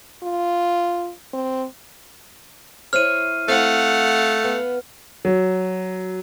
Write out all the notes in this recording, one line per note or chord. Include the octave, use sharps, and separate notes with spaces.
F4
C4
E4 C5 C#5 F6 D#7
A3 C4 F5 F#5
B3
F#3